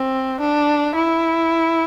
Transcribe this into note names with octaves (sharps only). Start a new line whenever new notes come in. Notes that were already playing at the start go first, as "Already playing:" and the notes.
Already playing: C4
D4
E4